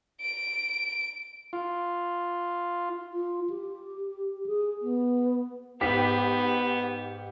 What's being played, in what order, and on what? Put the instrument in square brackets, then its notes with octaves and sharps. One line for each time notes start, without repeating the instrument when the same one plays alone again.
[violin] D7
[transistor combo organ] F4
[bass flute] F4
G4
G#4
B3
[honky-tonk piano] G#2 G4 B6 [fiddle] B3